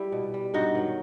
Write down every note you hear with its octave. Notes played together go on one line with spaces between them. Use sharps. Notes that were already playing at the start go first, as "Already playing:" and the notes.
Already playing: G3 E4 G4
B2
G3
G2 D#4 F#4
D#3 F#3